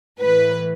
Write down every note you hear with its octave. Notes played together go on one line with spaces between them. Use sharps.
A2 E3 B4